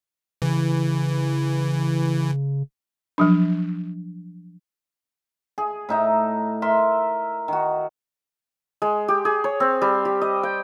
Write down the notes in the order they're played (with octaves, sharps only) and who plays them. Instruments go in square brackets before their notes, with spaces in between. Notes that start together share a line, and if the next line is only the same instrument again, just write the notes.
[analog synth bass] C#3 [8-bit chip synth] E3
[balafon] F3 F#3 D4
[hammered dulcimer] G#4
A2 D#4 E5 A#5
A#4 E5 C6
D#3 F#4
[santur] G#3
G4
G#4
C#5
C4
G3
G4
D#5
G5